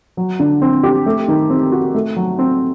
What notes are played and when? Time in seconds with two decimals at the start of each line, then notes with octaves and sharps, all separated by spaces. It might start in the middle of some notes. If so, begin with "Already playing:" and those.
0.17 F#3
0.40 D3
0.62 C4
0.83 G4
1.06 A3
1.28 D#3
1.50 C4
1.72 F#4
1.95 A3
2.16 F#3
2.39 C4